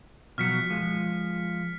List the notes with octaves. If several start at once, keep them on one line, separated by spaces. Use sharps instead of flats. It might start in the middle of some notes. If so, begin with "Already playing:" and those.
B2 F3 F#3 F6 B6 C#7
F3 G#3